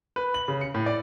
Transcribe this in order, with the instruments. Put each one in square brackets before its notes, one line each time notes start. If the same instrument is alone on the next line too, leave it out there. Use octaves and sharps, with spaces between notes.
[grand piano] B4
F#7
C#3
C#7
A2
D5